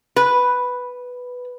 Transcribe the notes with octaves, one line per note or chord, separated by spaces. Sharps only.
B4